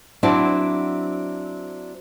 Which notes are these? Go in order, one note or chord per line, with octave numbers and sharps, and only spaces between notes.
F#3 C4 D4 E4 D5 A5